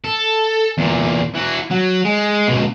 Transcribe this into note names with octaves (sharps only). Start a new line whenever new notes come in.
A4
E2 A#2
E3 F#4
F#3
G#3
C#2 B2